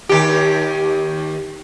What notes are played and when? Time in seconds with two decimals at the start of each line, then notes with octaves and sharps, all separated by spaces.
0.09 D#2 G4